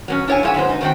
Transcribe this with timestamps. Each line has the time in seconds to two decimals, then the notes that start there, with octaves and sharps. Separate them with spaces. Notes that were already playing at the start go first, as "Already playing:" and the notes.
0.08 F#3 B3 C#4
0.28 D4 E4 C#5 F5 G#5
0.43 G#2 F3 C#5 E5 F#5 G#5
0.54 G#2 F#3 B3 C5
0.69 D#4
0.81 D#3 A3 C4 F#4 G5